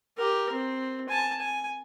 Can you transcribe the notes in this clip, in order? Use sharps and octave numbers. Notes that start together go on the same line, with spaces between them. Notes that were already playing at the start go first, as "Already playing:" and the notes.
G4 A#4
C4
G#5 A5
G#5